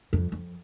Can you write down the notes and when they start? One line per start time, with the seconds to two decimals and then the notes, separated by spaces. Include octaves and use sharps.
0.13 F2
0.32 F2